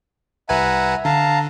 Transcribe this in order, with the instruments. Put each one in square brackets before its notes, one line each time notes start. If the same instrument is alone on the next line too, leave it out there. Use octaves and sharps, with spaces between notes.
[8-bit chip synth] C2 B4 G#5 [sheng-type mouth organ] E5 F#5 A#5
[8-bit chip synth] D3 [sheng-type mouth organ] F5 A5 A#5